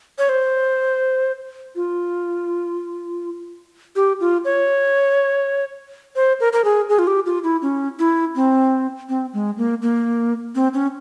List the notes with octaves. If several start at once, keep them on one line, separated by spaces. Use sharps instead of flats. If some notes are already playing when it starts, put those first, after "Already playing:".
C#5
C5
F4
G4
F4
C#5
C5
A#4
A#4
G#4
G#4
F4
G4
F4
E4
C#4
E4
C4
C4
G#3
A#3
A#3
C4
C#4